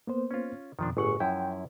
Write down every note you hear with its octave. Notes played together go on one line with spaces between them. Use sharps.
A#3 B3 C5
C#4 F4
F2 B2 D#3 F3 D4
G1 A2 G#4 F#5 C#6
F#2 F3 E4 G5